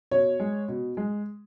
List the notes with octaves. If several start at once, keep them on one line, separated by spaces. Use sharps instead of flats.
B2 C#5
G#3
B2
G#3